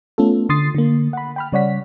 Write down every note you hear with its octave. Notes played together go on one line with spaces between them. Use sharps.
A3 B3 C#4 F4 A4
D3 C6 D#6 A6 C7
D3 A#3
F#5 B5
G5 B5 F6
C#3 G3 C#5 D5 F#5 B6